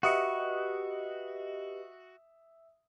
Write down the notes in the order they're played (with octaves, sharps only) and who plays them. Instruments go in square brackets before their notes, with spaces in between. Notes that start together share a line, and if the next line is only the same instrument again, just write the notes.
[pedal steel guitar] F#4 [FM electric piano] G4 B4 D#5 [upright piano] E5 D#6 C#7